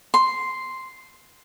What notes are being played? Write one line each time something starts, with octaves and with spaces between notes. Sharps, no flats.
C6